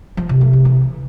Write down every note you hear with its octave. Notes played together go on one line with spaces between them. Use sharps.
F3
C3
A3
C3
E3